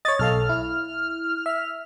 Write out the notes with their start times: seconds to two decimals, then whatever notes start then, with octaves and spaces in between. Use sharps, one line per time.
0.05 C#5 D#5 A6
0.19 B1 A4 F5 F6
0.49 E4
1.46 E5